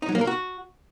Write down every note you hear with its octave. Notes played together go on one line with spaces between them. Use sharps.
D#4
F#3
A#3
A#4
F#4